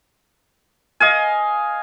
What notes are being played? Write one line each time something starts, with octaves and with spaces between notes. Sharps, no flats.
D#5 F5 G#5